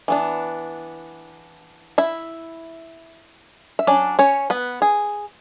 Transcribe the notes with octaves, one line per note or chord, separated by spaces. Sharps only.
E3 B3 D4
E4 E5
E5
F#3 C#4 D4 D5
C#4 C#5
B3 B4
G#4